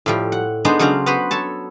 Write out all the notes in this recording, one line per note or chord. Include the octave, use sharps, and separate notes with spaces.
A2 F3 G3
F#5
G#3 B3 D4 D#4 C5
C#3 F#3 D4 C5 F5 A#5
B3 F#4 B4 C5 F#5
A4 C#5 A5